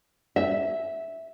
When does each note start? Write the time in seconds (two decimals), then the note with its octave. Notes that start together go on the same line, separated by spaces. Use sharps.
0.36 E5